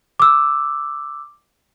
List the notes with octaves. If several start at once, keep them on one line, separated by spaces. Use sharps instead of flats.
D6 E6